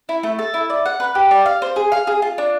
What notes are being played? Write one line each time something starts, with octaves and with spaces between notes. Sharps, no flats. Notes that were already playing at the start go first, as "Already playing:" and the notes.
E4
A3
A4
E4
D5
F#5
B4
G4
D5
F5
C5
G#4
F5
G#4
F4
D4